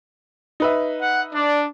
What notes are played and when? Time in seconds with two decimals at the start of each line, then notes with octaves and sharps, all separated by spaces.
0.60 D#4 B4 E5
1.01 F#5
1.33 D4 D5